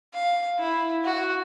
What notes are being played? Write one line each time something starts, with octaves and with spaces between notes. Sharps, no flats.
F5
E4
F#4